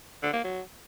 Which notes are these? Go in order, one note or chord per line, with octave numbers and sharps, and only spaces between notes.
D3
A#3
F#3